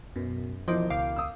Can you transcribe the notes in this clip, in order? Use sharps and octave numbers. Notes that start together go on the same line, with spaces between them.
F#2 B2
E1 E3 F3 C5 D#5 D6 G6
C#2 F5 D6
D#6 E6